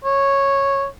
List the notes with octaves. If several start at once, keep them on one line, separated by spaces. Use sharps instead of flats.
C#5